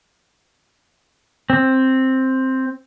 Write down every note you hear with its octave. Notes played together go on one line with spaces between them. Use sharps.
C4